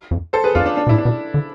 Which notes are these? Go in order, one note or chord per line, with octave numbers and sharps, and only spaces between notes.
F2
A4 C5
G#4 B4
F2 D4 F4
D4
D4
B2
A2 E4
D4
B2
D3